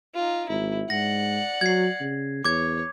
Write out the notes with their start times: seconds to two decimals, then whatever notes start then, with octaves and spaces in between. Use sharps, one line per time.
0.14 D#4 F4
0.49 G#1 E4
0.90 G#2 D5 F#5 A#6
1.61 F#3 G#6 C7
2.00 C#3
2.45 E2 C#5 D6 G#6